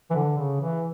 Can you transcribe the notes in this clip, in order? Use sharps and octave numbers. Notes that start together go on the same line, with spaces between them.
E3
D3
C#3
E3